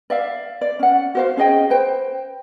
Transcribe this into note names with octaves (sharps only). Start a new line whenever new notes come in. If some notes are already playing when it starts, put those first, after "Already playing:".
D5 E5 F5
D5
C#4 F#5
F#4 C5 F5
C#4 G#4 D#5 G5
B4 C5 G5